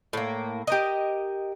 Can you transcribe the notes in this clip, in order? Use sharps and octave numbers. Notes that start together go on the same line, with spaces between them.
A2 A#3
G4 A#4 D#5